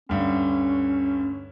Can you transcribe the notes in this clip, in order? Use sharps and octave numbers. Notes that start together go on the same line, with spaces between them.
D2 G2 C#4